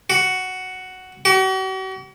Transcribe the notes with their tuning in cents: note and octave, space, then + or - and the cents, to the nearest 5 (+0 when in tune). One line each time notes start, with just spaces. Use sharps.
F#4 +5
F#4 +45